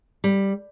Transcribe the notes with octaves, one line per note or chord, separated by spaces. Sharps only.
G3